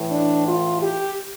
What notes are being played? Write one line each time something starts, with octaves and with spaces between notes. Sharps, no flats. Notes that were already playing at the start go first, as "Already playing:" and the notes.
Already playing: A2 E3
D4
F4
G4